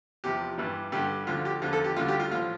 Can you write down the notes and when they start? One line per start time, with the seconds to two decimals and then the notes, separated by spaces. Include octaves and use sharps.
0.24 E2 C3 F3 G4
0.58 G2 E3 G3
0.92 G2 D3 G3 G4
1.27 D2 D3 F3 F4
1.45 G4
1.62 E2 D3 F3 F4
1.73 A4
1.84 G4
1.96 D2 D3 G3 F4
2.08 G4
2.20 F4
2.31 A2 F4
2.35 F3